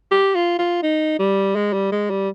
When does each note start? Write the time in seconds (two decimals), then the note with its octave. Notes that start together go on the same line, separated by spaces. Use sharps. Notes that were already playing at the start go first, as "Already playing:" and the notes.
0.11 G4
0.35 F4
0.59 F4
0.83 D#4
1.19 G3
1.55 G#3
1.73 G3
1.92 G#3
2.10 G3